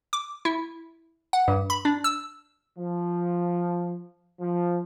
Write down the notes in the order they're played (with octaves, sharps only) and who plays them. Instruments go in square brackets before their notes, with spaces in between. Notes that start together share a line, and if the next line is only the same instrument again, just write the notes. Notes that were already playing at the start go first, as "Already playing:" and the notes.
[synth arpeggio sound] D6
E4
F#5
G2
B5
D4
E6
[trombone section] F3
F3